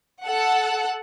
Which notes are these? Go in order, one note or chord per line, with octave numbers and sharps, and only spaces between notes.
A4 F#5